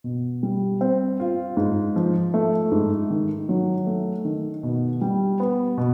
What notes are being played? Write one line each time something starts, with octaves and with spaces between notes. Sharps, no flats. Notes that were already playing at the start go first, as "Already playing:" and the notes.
B2
G3
C4
F4
G#2
F3
A3
G#2
D#3
F#3
A3
D#3
B2
G3
B3
B2